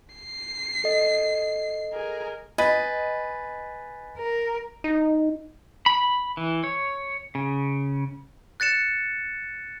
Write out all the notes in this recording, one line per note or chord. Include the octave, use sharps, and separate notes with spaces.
C7
A4 D#5
G#4 A#4
B4 D#5 G#5 A6 B6
A#4
D#4
B5
E3
C#5
C#3
F#6 A6 C#7 E7